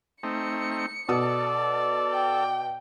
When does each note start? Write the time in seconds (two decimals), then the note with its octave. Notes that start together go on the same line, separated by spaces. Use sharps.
0.23 A3 C4 D#4 C#7
1.09 B2 A4 D5 D#6
2.11 G5